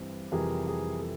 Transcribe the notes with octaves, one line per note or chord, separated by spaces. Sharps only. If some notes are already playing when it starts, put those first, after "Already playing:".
Already playing: G2 E3 G3 C4
F2 C3 E3 G3 G#4 A#4
G#4 A#4
A4